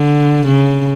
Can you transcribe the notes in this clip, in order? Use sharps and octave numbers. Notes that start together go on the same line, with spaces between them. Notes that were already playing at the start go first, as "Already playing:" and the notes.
Already playing: D3
C#3